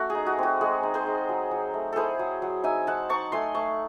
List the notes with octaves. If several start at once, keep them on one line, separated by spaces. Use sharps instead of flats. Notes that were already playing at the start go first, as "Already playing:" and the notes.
Already playing: A3 C#4 F#4
G#4
D#4
F#4
C4 F#4
G#3 G#4
D#4
G#4 C5
D#4
F#3
F#3
A3
E4 G#4 A4 C5
F#3
F#3
D#4 E5 G#5
D#4 F#5 A5
D#4 A5 C#6
A3 G#5 C6
A3 A5 C#6